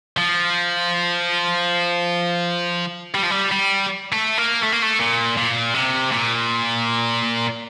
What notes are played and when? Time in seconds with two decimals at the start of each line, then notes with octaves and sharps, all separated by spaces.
0.18 F3
3.14 G3
3.23 F3
3.31 G3
3.51 G3
4.13 A3
4.38 A#3
4.63 A3
4.73 A#3
4.83 A3
5.00 A#2
5.37 A#2
5.74 C3
6.12 A#2